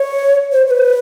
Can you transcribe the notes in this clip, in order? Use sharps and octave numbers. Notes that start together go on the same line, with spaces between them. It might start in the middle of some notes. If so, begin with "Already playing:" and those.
Already playing: C#5
C5
C5
B4